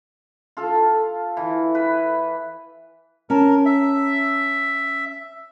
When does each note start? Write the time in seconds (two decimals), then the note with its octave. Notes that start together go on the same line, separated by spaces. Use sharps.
0.57 F4 A4 F5
1.37 E3
1.75 B4
3.30 C#4 A#4 A5
3.65 E5